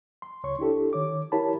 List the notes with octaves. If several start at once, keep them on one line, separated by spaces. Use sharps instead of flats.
C6
C#2 C#5 C6 C#6
D4 E4 G4 A4
D#3 C#5 D6
E4 G4 A#4 C#5 A5 B5